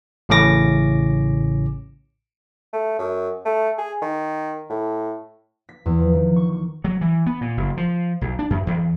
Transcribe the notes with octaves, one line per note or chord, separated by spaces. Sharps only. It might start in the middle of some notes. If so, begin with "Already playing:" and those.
A1 A2 C#3 C#4 D6 A#6
A3
F#2
A3
G#4
D#3
A2
B6
E2
F3
D#3
C#6
C#6
F#3
E3
B3
A#2
F#1
F3
B1
D4
F#2
E2